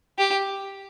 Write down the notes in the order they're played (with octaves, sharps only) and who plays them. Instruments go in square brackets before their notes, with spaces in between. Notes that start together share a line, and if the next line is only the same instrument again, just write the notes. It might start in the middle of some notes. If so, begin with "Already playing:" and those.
[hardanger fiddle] G4